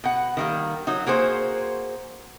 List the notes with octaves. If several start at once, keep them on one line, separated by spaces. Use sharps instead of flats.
B2 F#5
D#3 G3 A#3
F#3 D#4
A#3 F#4 G#4 C5